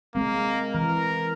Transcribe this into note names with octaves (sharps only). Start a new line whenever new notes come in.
G#3 A#3 C4
E3 A#4